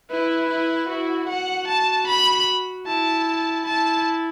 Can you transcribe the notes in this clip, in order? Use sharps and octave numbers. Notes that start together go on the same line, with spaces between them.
E4 B4
E4
E4 F#4
F#4 F#5
A5
B5
E4 A5
E4 A5